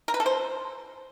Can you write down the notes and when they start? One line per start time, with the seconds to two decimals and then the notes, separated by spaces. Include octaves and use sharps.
0.08 A#4
0.14 B4
0.20 A4
0.26 C5